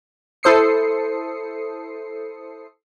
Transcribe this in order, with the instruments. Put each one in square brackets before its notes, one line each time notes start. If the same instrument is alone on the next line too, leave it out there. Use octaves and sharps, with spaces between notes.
[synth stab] E4 A4 C5 D#6 C7 C#7